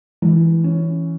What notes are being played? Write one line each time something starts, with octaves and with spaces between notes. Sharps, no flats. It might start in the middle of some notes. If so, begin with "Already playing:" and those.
E3
C#4